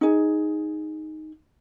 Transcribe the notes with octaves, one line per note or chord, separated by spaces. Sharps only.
D#4 G#4